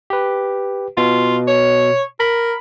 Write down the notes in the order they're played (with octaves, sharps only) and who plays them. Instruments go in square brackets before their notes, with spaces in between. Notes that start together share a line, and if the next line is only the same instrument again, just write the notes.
[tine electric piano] G4 B4
[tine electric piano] B2 [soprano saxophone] F4
[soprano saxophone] C#5
[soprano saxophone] A#4 [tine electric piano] B5